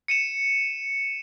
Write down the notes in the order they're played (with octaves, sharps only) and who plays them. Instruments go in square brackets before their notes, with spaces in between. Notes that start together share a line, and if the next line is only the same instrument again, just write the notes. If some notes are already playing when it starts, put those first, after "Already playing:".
[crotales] C#7 D#7 E7